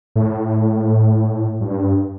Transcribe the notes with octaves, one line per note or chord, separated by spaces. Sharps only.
A2
G2